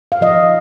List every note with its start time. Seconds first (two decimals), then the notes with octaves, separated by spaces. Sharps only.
0.12 F5
0.21 F3 D#5